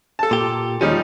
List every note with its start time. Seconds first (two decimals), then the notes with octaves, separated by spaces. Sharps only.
0.19 A4 A5
0.31 A#2 G4
0.81 D#2 F3 G3 G#3 C#4 D#4